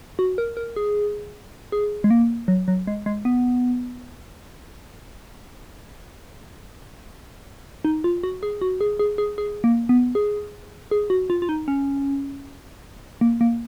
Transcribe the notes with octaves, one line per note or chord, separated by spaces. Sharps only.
F#4
A#4
A#4
G#4
G#4
G#3
A#3
F#3
F#3
G#3
G#3
B3
D#4
F4
F#4
G#4
F#4
G#4
G#4
G#4
G#4
A#3
B3
G#4
G#4
F#4
F4
F4
D#4
C#4
A#3
A#3